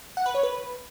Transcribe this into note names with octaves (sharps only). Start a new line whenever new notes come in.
F#5
B4
C#5
B4